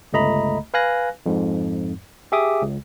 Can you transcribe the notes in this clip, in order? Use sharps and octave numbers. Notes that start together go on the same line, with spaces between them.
G1 C#2 A3 D#5 A#5 B5
B4 F5 G#5 F#6 A#6
F2 G#2
G4 G#4 E5 D6 D#6
C#2